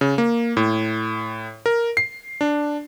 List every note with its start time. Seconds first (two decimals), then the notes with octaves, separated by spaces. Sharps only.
0.01 C#3
0.18 A#3
0.57 A2
1.66 A#4
1.97 C7
2.41 D4